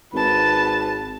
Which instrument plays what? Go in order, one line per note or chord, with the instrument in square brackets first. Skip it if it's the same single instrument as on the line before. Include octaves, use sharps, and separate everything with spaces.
[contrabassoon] G#1 [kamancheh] B4 A5